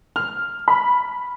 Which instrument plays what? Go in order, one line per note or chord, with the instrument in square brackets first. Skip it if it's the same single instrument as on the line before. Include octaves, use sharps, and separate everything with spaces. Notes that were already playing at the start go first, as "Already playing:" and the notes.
[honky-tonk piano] F6
B5